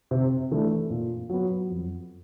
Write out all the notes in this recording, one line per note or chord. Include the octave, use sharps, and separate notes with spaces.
C3
E3 A3 D4
A#2
F#3 B3
F2